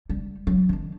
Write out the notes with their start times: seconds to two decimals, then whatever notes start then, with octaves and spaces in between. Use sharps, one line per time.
0.09 G3
0.47 F#3
0.69 D#3 D4